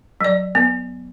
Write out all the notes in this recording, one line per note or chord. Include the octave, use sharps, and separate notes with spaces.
F#3 D5
B3